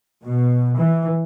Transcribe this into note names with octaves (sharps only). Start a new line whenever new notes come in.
B2
E3